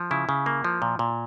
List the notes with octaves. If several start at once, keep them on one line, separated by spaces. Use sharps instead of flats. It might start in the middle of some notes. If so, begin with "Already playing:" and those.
Already playing: F3
C#3 E4
C#3
A#3
F3
A#2
A#2